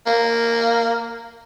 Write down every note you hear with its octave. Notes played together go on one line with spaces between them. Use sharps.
A#3